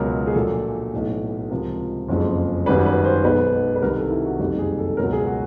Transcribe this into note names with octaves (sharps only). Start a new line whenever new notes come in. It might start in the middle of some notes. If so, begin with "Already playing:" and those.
Already playing: C#2 B2 F#3 A#4
G#4
A#1 A#2 F#3 A4
B1 A2 E3
C#2 C3 F3 A#4
F#1 F2 C#3 F3 G#3
G#1 F#2 D#3 G3 B4
B4
C5
B1 B2 G#3 B4
B4
C2 C3 D#3 G3 A#4
A4
E4
F#4
F#1 F2 C3 D#3 G3 F#4
G#4
A4
C#2 B2 F#3 A#4
G#4
F#4